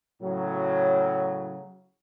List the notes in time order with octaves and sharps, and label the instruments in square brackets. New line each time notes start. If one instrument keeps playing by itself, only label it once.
[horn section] A2 C#3 F#3